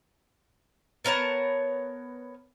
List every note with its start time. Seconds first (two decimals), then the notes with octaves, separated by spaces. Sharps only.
1.05 B3 A#4 C#5 A5